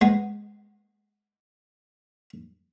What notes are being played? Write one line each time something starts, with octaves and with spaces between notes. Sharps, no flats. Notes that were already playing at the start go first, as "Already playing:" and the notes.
G#3 B3